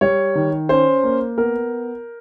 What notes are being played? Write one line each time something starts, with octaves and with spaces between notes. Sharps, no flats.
G3 C#5
D#3
C#4 C5
A#3
B3 A#4